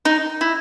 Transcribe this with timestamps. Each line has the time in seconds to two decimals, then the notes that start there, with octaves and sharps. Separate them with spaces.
0.05 D#4
0.41 E4